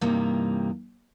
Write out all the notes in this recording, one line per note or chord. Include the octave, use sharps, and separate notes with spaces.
G2 C3 E3 G3 A#3 D#4